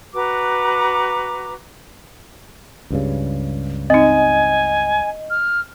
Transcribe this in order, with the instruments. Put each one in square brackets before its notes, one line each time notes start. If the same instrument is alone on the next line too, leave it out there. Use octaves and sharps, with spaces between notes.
[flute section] F#4 B4 A#5 D6
[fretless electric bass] C#2 G2 C#3
[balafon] C4 D#4 [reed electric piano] D#5 [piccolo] G#5
[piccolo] F6